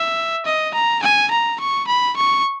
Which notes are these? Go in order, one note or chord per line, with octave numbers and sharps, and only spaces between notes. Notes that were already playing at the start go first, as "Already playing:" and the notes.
Already playing: E5
D#5
A#5
G#5
A#5
C#6
B5
C#6